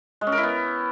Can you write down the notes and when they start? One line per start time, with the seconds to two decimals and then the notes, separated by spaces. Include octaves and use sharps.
0.21 G#3
0.27 C#4
0.32 A#4
0.38 E4
0.43 B3